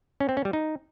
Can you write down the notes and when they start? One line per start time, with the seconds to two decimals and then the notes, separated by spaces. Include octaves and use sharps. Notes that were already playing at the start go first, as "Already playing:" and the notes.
0.20 C#4
0.29 C4
0.37 C#4
0.45 G3
0.53 D#4